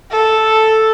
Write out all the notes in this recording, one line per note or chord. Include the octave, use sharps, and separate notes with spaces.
A4